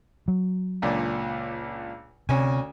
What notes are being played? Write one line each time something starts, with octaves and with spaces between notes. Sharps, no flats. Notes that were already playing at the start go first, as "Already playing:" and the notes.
F#3
C#2 A#2 D4
D2 C3 C#4 G#5